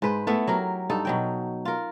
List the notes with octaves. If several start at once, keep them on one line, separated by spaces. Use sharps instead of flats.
G#2 B4 C5
A3 B3 E4
F#3 G4 A#4
G2 D#4 A4
B2 F#3 G5
F4 A#4